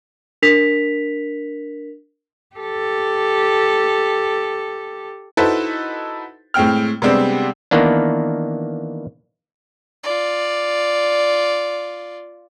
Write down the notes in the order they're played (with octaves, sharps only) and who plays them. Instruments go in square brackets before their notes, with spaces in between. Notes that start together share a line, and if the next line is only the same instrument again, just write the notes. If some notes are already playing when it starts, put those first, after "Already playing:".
[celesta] D4 A#4 B6 F7
[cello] G4 A4
[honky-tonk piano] D#4 E4 F#4 A4 B4 C5
A2 G#3 C4 G5 F6
C3 G3 G#3 B3 C4 D4
[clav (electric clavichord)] D#3 E3 A#3 B3 D4
[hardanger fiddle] F4 D5